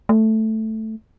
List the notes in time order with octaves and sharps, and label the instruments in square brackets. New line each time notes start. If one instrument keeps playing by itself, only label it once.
[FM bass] A3